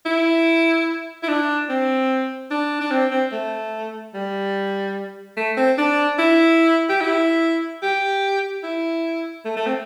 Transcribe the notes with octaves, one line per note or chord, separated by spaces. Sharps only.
E4
E4
D4
C4
D4
D4
C4
C4
A3
G3
A3
C4
D4
E4
G4
E4
G4
E4
A3
A3
C4